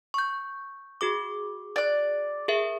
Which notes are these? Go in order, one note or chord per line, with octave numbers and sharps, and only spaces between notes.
C#6 G6
F#4 G#4 D6
D5 F#6
G#4 A#4 E5